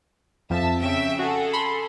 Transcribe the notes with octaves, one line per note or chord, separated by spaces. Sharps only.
F2 F3 E5 A5
C#3 E5 G5
F#4 G#4 A4
B5 C6